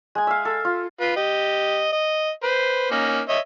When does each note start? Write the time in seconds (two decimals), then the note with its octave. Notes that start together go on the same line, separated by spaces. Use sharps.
0.15 G#3 G#5
0.27 E5 F5
0.45 A4
0.65 F4
1.00 F4 B4
1.16 G4 D#5
1.92 D#5
2.43 B4 C5
2.91 A#3 C#4 D#4
3.29 C#5 D#5 E5